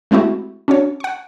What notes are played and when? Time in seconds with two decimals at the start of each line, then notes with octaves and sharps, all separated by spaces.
0.11 G#3 A3 C4 E4 F#4 G4
0.68 C#4 D4 F#4 C#5
1.00 F#5 C#6